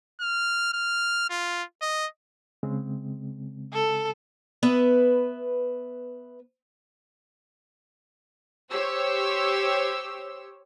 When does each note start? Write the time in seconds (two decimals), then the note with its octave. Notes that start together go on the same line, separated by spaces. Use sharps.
0.21 F6
0.74 F6
1.30 F4
1.82 D#5
2.63 C#3 G#3 C4
3.73 A4
4.63 B3 B4 E5
8.71 G4 C5 C#5 E6